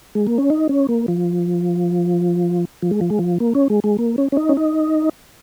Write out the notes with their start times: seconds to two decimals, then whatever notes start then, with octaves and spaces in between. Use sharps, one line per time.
0.15 G#3
0.27 A#3
0.38 C#4
0.50 D#4
0.69 C#4
0.89 A#3
1.08 F3
2.82 F3
2.91 G#3
3.01 F3
3.10 G#3
3.19 F3
3.40 A#3
3.55 C#4
3.70 G#3
3.84 G#3
3.98 A#3
4.18 C#4
4.32 C#4
4.37 D#4
4.49 C#4
4.57 D#4